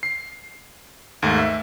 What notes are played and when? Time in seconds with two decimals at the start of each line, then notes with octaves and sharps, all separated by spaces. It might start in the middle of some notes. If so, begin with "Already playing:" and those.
0.03 C7
1.22 D#2 G#2 A3
1.38 E5